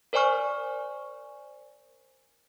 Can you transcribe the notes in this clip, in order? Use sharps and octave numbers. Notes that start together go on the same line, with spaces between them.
A#4 C5 D5 G#5 C#6 F6